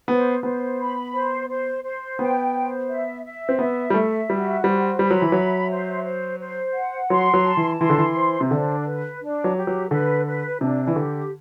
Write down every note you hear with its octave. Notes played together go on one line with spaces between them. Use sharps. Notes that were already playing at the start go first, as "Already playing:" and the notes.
B3 C5
B3 C5
B5
C5
C5
C5
B3 G5
C5
E5
E5
C4
B3 E5
G3
A3 E5
G3 F#4
G3 C5
G3 B5
F#3
E3
F#3 E5
C5
C5
C5
F#5
F#3 C6
F#3
A5
E3
E3 C6
D3
E3
C5
C3
D3 D4
B4
D4
F#3
G4
F#3
D3 B4
B4
C3 D4
E3
D3 G4